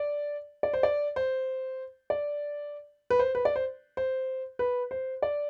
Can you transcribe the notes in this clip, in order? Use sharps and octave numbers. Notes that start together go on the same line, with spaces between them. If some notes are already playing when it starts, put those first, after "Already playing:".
Already playing: D5
D5
C5
D5
C5
D5
B4
C5
B4
D5
C5
C5
B4
C5
D5